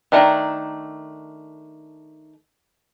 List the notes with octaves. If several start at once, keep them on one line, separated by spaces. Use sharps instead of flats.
D#3 A3 D4 A#5